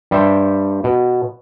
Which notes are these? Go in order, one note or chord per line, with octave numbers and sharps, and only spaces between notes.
G2 G3 C5 E5
B2